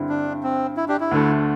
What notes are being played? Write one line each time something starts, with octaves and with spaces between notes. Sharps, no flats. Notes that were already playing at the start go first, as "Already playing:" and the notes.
Already playing: G2 D3 C4 E4
D4
C4
E4
D4 G4
E4
D2 D3 A3